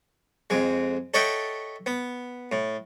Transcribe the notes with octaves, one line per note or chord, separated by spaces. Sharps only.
F2 G#3
A4 C#5 D#5 E5 F#5 G5
B3
A2